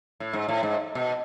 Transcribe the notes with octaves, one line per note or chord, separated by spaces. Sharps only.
A2
G#2
A2
G#2
B2